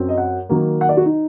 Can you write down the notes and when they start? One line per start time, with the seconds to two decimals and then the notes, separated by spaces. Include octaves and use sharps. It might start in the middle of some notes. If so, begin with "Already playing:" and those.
Already playing: F#2 F#3 C4
0.09 D#5
0.17 F#5
0.49 D#3 F#3 A#3
0.81 F#5
0.89 D5
0.97 F#4
1.06 D#4